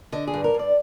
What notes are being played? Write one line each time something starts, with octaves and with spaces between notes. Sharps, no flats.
D3 D#5
G#4
G2
A#4
G2 D5